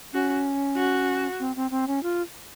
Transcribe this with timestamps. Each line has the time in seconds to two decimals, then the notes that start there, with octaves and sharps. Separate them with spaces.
0.13 C#4 F#4
0.76 F#4
1.40 C4
1.56 C4
1.71 C4
1.88 C#4
2.03 F4